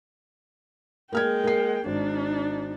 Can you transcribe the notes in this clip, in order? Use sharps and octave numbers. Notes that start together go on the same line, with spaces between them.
G#3 A#3 G5 F6 G#6
A#3 C7
G#1 D4 D#4